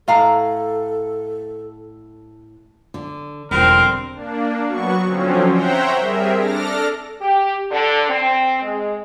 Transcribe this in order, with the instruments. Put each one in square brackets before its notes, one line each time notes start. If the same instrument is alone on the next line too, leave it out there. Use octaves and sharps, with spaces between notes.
[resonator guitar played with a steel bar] A2 F5 A#5 [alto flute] A4
[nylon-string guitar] D3
[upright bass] E1 F3 [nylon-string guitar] D3 G3 C5 [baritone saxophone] C4 [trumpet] A#4
[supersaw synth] A#3 D4
F#3 B3 F#4 C#6
D3 F3 F#3 C4 C#4
C5 C#5 E5 F#5 G5 A#5
G3 C4 G#4 A#4 E5
D4 A4 D6 F6 A#6
[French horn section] G4
D3
C4
G#3